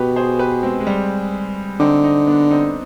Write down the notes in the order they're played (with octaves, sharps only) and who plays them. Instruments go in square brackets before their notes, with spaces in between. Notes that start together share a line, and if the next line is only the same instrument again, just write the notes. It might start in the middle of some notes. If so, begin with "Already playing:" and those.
Already playing: [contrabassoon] B2 [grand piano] G4 B4
[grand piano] G#4 C5
G4 B4
G#3 C4
G#3
G3
[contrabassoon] D3 [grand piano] C4 D#4
[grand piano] C4 D#4
B3 D4
C4 D#4